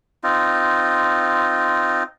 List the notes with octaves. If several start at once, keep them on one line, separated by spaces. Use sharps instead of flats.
C4 D#4 F4